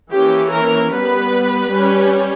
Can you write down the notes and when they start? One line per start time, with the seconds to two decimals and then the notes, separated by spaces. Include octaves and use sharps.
0.12 E3 A#3 C#4 G4
0.51 A#4
0.91 G3 B3 B4
1.71 G3 C#4